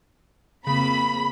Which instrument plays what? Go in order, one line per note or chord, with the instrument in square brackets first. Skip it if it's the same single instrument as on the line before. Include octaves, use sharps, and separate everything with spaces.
[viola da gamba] F2 A#3 C4 [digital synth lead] C#3 [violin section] B5